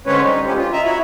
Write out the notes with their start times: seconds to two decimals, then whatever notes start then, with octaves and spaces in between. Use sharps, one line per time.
0.06 D3 G#3 C4 C#4 B4 C#5
0.23 G3 D#4
0.46 D3 F3 G#3 B3 C#4 G4
0.57 F4
0.73 D#5 E5 A#5
0.85 E4 F#4 C#5 E5 B5